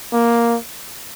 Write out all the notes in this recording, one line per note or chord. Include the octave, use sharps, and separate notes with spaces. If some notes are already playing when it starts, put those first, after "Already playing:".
A#3